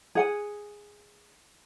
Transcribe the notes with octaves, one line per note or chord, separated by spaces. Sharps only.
G#4 F#5 G#5